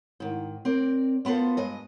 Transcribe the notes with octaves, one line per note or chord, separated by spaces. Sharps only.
G#2 D#3
C4 A#4 D5
A#3 B3 F4 A4 C5
G2 G#3 D#5